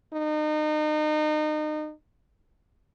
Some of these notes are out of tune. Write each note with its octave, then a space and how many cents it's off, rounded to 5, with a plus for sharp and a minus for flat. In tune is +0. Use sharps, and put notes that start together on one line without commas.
D#4 -30